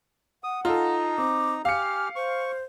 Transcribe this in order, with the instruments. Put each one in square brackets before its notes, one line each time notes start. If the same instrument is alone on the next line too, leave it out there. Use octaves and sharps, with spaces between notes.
[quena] F#5 [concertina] D#6
[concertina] D#4 A#5 [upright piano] F4 A4
[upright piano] C4 [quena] D6
[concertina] G4 F6 [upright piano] F5 C#7 [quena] G#5
[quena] C5 [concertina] C#6